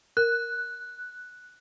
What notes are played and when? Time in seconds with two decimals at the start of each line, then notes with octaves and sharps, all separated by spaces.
0.17 A#4 F#6